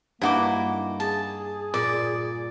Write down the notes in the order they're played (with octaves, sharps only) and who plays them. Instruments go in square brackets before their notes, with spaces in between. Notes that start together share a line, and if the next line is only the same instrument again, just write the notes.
[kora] G2 D#4 [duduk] A#3 [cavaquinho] E4 F#4 D6
[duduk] G#4 [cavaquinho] A5
[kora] A#2 [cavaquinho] D5